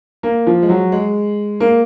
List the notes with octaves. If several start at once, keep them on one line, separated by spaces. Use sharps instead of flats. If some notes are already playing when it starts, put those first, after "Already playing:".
A#3
F3
G#3
F#3
G#3
A#3